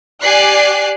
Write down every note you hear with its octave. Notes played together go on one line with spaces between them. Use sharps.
G4 D5 G#5 F#6 C7